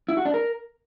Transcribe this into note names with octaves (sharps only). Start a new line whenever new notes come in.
E4
F#4
D4
A#4